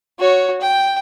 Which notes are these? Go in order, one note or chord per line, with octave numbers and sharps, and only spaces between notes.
F#4 C#5
G5